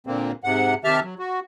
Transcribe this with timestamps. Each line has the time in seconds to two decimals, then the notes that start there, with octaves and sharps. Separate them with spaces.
0.07 A#2 D3 A#3 C4
0.44 G#2 C3 F#5
0.84 C3 D#3 G4 E5 A5 F6
1.02 F#3
1.19 F#4